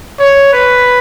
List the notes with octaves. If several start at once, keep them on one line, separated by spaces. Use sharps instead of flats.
C#5
B4